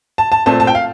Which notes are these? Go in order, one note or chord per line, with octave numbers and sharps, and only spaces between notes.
A5
A5
A#2 A3 C4 A5
A5
G5
F5